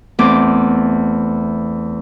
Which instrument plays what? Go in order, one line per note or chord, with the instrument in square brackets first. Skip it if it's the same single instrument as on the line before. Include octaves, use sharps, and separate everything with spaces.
[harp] E2 A3 C4 D6